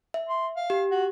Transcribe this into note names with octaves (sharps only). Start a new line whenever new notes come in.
E5
C6
F5
G4
F#4